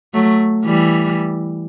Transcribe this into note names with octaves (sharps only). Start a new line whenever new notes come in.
F#3 A3
E3 G3